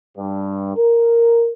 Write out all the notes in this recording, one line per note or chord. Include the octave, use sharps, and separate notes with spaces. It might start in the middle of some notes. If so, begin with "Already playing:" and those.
G2
A#4